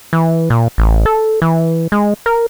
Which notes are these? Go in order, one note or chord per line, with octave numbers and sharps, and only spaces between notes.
E3
A#2
A1
A4
E3
G#3
A#4